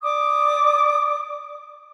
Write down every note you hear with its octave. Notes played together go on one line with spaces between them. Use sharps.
D5 D6 D#6